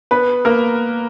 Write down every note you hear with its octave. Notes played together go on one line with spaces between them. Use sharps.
B3 B4
A#3 A#4